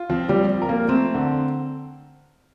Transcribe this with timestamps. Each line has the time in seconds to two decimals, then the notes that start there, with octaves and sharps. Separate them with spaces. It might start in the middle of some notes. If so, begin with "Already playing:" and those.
Already playing: F4
0.09 F3 C4
0.29 G3
0.36 F3
0.62 A#4
0.69 A#3
0.88 A3 C4
1.15 D3